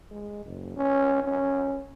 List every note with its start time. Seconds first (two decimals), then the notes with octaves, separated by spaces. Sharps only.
0.11 G#3
0.45 F#1
0.76 C#4
1.23 C#4